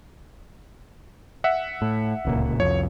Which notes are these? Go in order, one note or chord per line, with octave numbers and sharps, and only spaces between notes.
E5 F#5
A2
D1 C#2 A#2
C2 F2 C#5